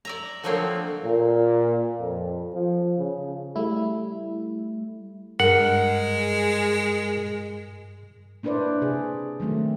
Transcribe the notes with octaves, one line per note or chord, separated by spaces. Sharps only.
D5 E5 A#5
D3 F3 F#3 A3 A#3 C4
A#2
F2
F3
C#3
G3 A3 E4
G2 G#3 A#4 F#5
A#3 D4 E4 B4 C5 D5
C3 G#4
D#3 F#3 A3 C4